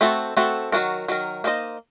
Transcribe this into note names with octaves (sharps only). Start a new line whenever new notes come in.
A3 C4 F#4 A4
A3 C4 F#4 A4
D#3 F#3 A#3 F#4 A#4
D#3 F#3 A#4
A#3 D#4 A4 C5 D#5